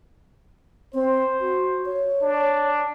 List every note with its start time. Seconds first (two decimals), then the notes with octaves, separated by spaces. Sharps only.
0.94 C4 C5
1.40 F#4
1.85 C#5
2.22 D4